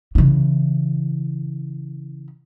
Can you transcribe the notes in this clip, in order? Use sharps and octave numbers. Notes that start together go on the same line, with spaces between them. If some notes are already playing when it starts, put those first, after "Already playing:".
C#3 E3